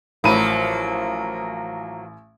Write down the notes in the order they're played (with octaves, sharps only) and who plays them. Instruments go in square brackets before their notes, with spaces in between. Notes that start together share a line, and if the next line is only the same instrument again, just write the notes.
[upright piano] A1 B5 D#7 [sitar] F3 F#3 A#3